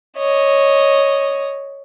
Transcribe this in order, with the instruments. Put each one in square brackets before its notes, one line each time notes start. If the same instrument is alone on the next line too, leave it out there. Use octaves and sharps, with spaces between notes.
[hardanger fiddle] C#5 D#5